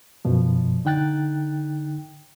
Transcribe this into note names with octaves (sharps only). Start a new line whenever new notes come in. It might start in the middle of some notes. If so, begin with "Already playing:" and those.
F#2 B2 F3
D3 D#4 G5 F#6 A6